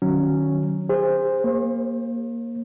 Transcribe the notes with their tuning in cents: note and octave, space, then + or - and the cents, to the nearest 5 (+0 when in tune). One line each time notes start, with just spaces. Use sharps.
D#3 -35 F#3 +0 C#4 +0
G#4 -40 C5 +0
A#3 +0 C5 +45